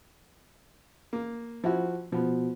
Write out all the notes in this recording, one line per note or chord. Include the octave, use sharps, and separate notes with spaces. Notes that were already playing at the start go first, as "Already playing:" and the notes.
A#3
F3 E4 F#4
B2 F3 B3